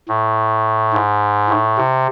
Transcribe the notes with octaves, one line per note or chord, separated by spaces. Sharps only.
A2
G#2
A2
C3